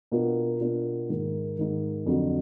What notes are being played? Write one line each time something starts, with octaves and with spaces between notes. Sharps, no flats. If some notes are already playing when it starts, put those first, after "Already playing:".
B2 A#3 D4 F4
B2 A#3 D4 F4
G#2 D#3 A#3
G#2 D#3 A#3
F2 D3 F#3